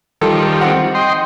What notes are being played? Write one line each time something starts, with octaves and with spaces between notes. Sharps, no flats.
D#3 F3 G3 A4
C4 F#5
D#5 G5 C6